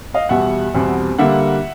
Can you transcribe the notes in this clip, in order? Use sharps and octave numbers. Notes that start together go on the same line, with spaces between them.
D#5 F5
E2 B2 G3 E5 F#5
E2 B2 G3 C4
D3 G3 A#3 E5 F#5